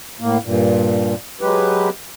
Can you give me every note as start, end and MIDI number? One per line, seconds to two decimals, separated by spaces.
0.20 0.38 45
0.20 0.38 58
0.44 1.14 43
0.44 1.14 46
1.41 1.89 54
1.41 1.89 56
1.41 1.89 67
1.41 1.89 71